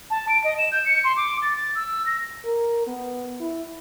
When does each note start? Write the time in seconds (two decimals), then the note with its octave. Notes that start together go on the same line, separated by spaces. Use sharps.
0.10 A5
0.29 D7
0.44 D#5
0.58 E7
0.72 G6
0.86 C#7
1.04 C6
1.17 D6
1.42 A6
1.56 A6
1.75 E6
2.06 A#6
2.45 A#4
2.87 B3
3.40 E4